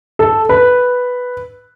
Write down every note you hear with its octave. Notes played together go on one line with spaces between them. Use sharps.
A4
B4